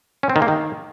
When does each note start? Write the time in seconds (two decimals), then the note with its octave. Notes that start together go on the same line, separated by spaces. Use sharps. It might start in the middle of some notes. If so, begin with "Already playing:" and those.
0.23 C#4
0.30 C4
0.36 D#3
0.42 A#3
0.48 D#3